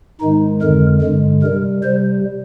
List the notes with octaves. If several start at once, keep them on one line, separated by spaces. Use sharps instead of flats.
G#2 D#3 G#3 D#4
F2 D3 G#3 A#4
G2 D3 G#3
C3 G3 A#4
C3 G3 C5